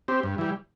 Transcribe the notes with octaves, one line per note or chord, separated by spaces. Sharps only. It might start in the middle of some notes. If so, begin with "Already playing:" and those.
C4 G4
G2
E3 G3